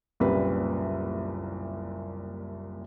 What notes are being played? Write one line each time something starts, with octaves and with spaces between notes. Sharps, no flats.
F#1 C2 A#2 G3 B4 B5